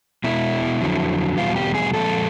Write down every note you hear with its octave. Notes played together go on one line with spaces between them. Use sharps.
B2 G#3 E4
F2 D3 F#3
E2 B2 G3 F4
G4
G#4
A#2 F3 G#3 A4